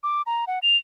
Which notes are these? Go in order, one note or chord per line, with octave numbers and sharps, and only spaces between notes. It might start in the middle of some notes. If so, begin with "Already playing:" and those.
D6
A#5
F#5
F7